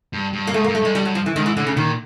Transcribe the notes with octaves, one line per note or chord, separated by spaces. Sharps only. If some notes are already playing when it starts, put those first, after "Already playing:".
G2
G2
A#3
G#2 A3
A#3
G2
A3
G2 G#3
G3
F#3
F3
E3
G#2 D#3
E3
A2 D3
C#3
A#2 D#3